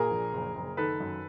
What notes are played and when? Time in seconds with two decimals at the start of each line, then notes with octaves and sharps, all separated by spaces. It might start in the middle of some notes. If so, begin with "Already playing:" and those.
Already playing: A#2 G#4 A#4
0.11 A#1
0.33 F#1
0.55 F#1
0.77 D#3 A4 B4
1.00 F#2